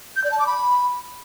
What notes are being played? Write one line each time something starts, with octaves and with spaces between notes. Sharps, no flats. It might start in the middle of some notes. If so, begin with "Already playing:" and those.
G6
D5
A5
D6
B5